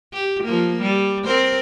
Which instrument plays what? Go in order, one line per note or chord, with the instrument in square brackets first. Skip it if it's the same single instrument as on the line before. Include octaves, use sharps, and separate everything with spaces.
[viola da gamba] G4
F3 A#3
G3
C4 A#4 C5